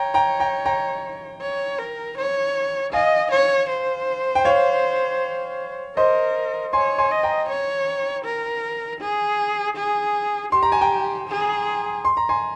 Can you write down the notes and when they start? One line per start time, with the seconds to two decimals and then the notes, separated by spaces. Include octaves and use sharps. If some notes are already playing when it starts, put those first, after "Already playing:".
Already playing: C#5 G5 A#5
0.14 G5 A#5
0.40 G5 A#5
0.66 G5 A#5
1.42 C#5
1.79 A#4
2.18 C#5
2.93 D#5 F5 G#5
3.31 C#5
3.69 C5
4.35 G5
4.45 C#5 F5
5.97 A#4 C5 D#5
6.73 C#5 G#5 C6
6.98 G#5 C6
7.11 D#5
7.23 G5 A#5
7.49 C#5
8.25 A#4
9.01 G#4
9.77 G#4
10.52 G4 C6
10.63 A#5
10.72 G#5
10.81 G5 A#5
11.29 G#4
12.05 C6
12.17 A#5
12.29 G#5 C6